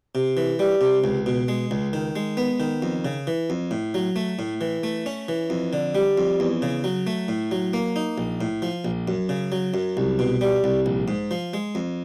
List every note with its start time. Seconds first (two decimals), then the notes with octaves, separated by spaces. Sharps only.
0.15 C3
0.37 E3
0.59 G3
0.81 C3
1.04 C#2
1.26 B2
1.48 G#3
1.71 C#2
1.93 D#3
2.16 G#3
2.37 B3
2.60 D#3
2.82 F2
3.05 C#3
3.27 E3
3.50 F2
3.71 A2
3.94 F#3
4.16 A3
4.39 A2
4.61 E3
4.83 A3
5.06 C#4
5.28 E3
5.50 F2
5.73 D3
5.95 G3
6.18 F2
6.40 E2
6.62 C#3
6.84 F#3
7.07 A3
7.28 A2
7.51 F#3
7.73 A#3
7.96 D#4
8.18 A#1
8.41 A2
8.62 F3
8.85 A#1
9.08 F#2
9.29 C#3
9.52 F#3
9.74 F#2
9.97 C2
10.19 B2
10.41 G3
10.64 C2
10.86 A#1
11.08 G#2
11.31 F3
11.54 G#3
11.75 F2